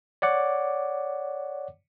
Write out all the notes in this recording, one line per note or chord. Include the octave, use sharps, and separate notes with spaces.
C#5 D5 F#5 D6